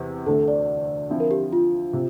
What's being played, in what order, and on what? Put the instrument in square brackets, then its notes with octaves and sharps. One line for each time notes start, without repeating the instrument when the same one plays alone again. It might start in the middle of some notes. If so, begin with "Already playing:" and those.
Already playing: [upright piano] E2 C3
[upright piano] D2 D3 A3 D4 [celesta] A4
[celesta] D5
[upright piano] D3 F3 C4 E4
[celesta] A#4
G4
F4
[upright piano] C3